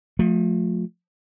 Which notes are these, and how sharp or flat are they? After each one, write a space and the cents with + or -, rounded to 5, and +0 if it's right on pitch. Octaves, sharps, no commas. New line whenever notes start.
F3 +35 A3 +0